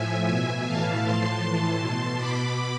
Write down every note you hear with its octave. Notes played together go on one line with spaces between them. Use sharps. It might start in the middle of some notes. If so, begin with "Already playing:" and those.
Already playing: A2 F3 E5 G#5
B2
A2 E3 F5 A5
A2 F3 A5 C6
A2 E3
B2
B2 B5 D6